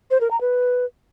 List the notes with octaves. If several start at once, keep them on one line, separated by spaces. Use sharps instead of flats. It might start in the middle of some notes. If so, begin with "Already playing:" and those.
C5
A#4
A#5
B4